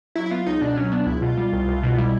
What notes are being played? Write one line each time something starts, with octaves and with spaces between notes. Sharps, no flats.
F#3 E4
E4
B3 F4
C#2 D#4
B2 D4
F#3 C#4
B3 D4
C#2 E4
B2 F4
G3
C2
C2
B2
G3 E4